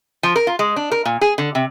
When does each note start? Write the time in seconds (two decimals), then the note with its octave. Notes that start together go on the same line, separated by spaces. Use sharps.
0.23 F3
0.36 A#4
0.47 F4
0.59 G#3
0.76 D4
0.92 A#4
1.05 A#2
1.21 G#4
1.38 D3
1.55 C3